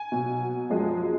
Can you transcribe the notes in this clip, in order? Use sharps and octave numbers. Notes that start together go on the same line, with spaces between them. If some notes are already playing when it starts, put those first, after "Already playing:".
Already playing: G#5
B2 F#3
F#2 F3 G#3